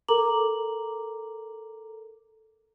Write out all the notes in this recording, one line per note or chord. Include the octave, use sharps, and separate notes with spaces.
A4 A#4 A#5 D6 F#7